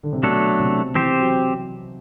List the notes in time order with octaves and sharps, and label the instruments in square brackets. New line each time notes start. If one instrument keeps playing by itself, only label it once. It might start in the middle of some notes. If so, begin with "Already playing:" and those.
[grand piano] D3
C3
[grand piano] B2 [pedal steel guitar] F#3 A3 D4 A4
[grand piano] C3
[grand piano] E3 [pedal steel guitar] C4 G4 C5
[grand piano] F#3